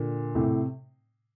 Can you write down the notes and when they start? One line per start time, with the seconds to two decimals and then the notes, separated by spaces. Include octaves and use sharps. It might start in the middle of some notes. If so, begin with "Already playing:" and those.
Already playing: A#2 D3
0.35 A2 C3